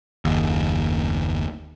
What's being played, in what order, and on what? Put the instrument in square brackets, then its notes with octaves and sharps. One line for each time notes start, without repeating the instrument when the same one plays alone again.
[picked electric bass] F#1 D#2